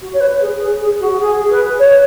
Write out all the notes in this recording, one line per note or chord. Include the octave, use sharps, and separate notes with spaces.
F#4
C#5
B4
G#4
G#4
G#4
F#4
G#4
B4
C#5